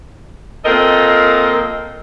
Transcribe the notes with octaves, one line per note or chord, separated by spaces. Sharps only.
A#2 C4 A4 A#4 D#5